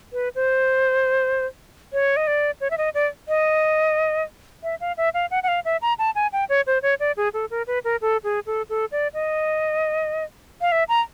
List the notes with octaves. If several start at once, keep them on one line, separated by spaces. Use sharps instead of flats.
B4
C5
C#5
D#5
D5
C#5
E5
D#5
D5
D#5
E5
F5
E5
F5
F#5
F#5
F5
E5
A#5
A5
G#5
G5
C#5
C5
C#5
D5
G#4
A4
A#4
B4
A#4
A4
G#4
A4
A4
D5
D#5
F5
E5
A#5